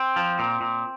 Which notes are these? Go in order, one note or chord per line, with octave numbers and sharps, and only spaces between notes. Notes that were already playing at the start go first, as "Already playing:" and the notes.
Already playing: C4
F3
A#2
A#2